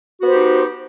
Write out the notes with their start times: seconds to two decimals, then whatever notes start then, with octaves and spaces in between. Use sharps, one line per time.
0.19 F#4
0.23 B3
0.26 C5
0.30 G4
0.34 D#4